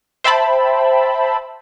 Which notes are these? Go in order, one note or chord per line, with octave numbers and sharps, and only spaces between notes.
C5 E5 G5 A5 B5